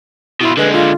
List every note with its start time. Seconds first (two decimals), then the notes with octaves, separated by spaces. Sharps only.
0.41 B2 E4 F4
0.57 D3 G#3 B4
0.73 F4